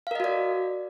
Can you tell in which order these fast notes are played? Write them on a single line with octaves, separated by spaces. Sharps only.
F5 A#4 D#5 F#4 D5